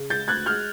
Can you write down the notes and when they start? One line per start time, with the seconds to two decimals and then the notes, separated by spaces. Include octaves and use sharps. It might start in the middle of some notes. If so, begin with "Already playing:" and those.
Already playing: C#3
0.10 G#3 G6 A6
0.28 D2 F#6 G#6
0.46 G#3 F6 G6